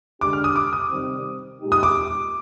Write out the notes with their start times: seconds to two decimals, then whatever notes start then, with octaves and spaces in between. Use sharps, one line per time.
0.21 D3 G#3 D4 G4 D6
0.33 F6
0.44 D#6
0.56 D6
0.73 D#6
0.90 C3 D#3 G3 C4
1.60 A#2 G#3 D#4 G4
1.72 D#6
1.83 D6